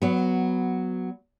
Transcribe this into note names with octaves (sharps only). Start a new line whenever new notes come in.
F#3 B3